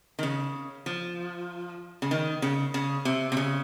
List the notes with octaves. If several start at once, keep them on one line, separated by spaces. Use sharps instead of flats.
D#3
C#3
F3
C#3
D#3
C#3
C#3
C3
C3
C#3